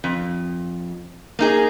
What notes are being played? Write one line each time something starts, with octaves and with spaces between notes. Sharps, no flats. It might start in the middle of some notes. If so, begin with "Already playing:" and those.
F2
A#3 D#4 G#4